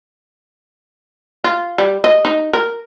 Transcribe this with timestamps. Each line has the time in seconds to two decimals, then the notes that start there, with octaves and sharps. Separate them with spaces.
1.44 F4
1.78 G3
2.04 D#5
2.25 D#4
2.53 A#4